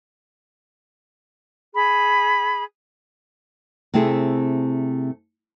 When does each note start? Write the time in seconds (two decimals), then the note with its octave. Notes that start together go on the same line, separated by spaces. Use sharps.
1.74 G#4 B5
3.94 C3 A3 C4 E4 G#4